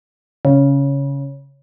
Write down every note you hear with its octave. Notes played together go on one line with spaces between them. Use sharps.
C#3